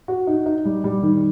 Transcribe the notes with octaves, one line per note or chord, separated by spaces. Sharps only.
F#4
D#4
D#4
G3
G3
D#3